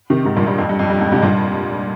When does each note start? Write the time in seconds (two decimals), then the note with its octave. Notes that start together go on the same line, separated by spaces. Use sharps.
0.10 C3 D#3
0.25 G#2 C3
0.37 G2 A#2
0.47 G2
0.58 F2
0.69 G2
0.79 F2
0.90 G2
1.01 F2 G#2
1.12 G#2 C3
1.22 G2 A#2